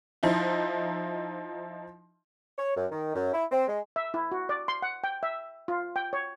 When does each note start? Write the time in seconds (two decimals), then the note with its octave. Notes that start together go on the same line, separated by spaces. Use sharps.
0.23 F3 D#4 E4
2.58 C#5
2.77 F#2
2.91 D#3
3.15 F#2
3.33 E4
3.52 C4
3.68 G#3
3.96 E5
4.14 E4
4.32 F#4
4.49 D5
4.68 C6
4.82 F#5
5.04 G5
5.23 E5
5.68 F4
5.96 G5
6.13 C#5